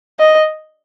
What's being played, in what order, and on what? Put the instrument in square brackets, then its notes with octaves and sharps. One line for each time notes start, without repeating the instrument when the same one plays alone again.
[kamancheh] D#5